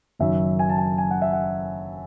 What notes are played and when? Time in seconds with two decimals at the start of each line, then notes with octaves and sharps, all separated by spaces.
0.19 F#1 F#2 D#3 E5
0.59 G#5
0.69 A5
0.78 G#5
0.98 G#5
1.11 F#5
1.22 E5
1.33 F#5